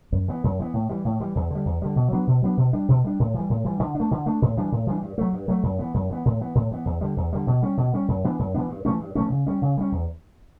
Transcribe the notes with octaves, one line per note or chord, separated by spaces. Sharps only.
F#2
E3 B3
F#2
E3 B3
A2
E3 G3
A2
E3 G3
E2
D3 G3
E2
D3 G3
B2
F#3 B3 D4
B2
F#3 B3 D4
B2
G3 D4
B2
G3 D4
A2
E3 G3
A2
E3 G3
D3
D4
A3
D3
A3 D4
A2
E3 G3 D4
A2
E3 G3 D4
G2
F#3 A3
G2
F#3 A3
F#2
E3 B3
F#2
E3 B3
A2
E3 B3
A2
E3 B3
E2
D3 G3
E2
D3 G3
B2
G3 C#4
B2
G3 C#4
F#2
E3 B3 D4
F#2
E3 B3 D4
G2
E3 A3 C#4
G2
E3 A3 C#4
C#3
G3 C#4
C#3
G3 C#4
E2